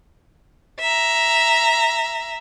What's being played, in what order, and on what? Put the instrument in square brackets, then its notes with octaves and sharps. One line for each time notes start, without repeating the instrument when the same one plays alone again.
[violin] E5 A#5